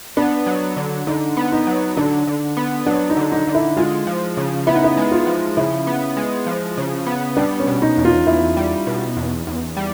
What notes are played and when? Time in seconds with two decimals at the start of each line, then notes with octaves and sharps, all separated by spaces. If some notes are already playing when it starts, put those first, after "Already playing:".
0.17 B3 D4
0.46 F#3
0.77 D3
1.07 D3 D#4
1.37 B3
1.52 D#4
1.67 F#3
1.97 D3 D4
2.27 D3
2.57 B3
2.86 F#3 D4
3.10 D#4
3.17 D3
3.32 D#4
3.47 D3
3.55 E4
3.77 G#3 F4
4.07 F3
4.37 C#3
4.67 B3 E4
4.75 D#4
4.84 E4
4.97 G#3
5.11 F4
5.27 F3
5.57 C#3 E4
5.87 B3
6.17 G#3
6.47 F3
6.78 C#3
7.07 B3
7.37 G3 D4
7.60 C#4
7.67 B2
7.82 D#4
7.97 E2
8.05 F4
8.27 E2 E4
8.57 G3
8.87 B2
9.16 E2
9.47 E2
9.77 G3